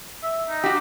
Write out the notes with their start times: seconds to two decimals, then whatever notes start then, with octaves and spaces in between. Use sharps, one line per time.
0.23 E5
0.49 D#4
0.64 F#4 G4